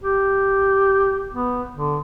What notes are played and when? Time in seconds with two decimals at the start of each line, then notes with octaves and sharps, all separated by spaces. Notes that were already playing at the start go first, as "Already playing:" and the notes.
0.04 G4
1.34 B3
1.75 D3